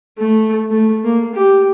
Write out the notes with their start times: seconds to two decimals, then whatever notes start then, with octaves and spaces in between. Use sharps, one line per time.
0.18 A3
0.70 A3
1.04 A#3
1.35 G4